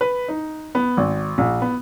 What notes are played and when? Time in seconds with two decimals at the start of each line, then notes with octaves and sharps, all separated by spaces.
0.01 B4
0.28 D#4
0.75 B3
0.97 G#1
1.38 A#1
1.62 B3